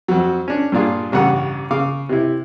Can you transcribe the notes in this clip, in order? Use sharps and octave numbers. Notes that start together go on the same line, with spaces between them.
F2 F#3
C#4 D4
G2 A#2 D4 F4 G#4
A1 G2 C#3 F#5
C#3 F5 D6
C3 E4